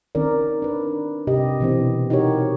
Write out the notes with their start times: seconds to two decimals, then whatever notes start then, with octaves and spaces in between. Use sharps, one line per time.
0.15 D#3 C4 C#4 A#4 D5
0.62 D4 B4
1.27 C3 G4 D#5
1.60 B2 E3 C4
2.10 D#4 F#4 G4 A#4 C#5